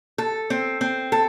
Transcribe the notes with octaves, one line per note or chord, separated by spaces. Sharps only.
A4
C4
C4
A4